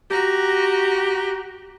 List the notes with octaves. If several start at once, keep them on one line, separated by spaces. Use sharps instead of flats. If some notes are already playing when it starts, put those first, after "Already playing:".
F#4 G4 A#5